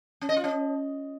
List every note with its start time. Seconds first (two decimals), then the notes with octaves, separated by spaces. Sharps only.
0.21 C#4
0.29 D#5
0.36 F4
0.44 C#4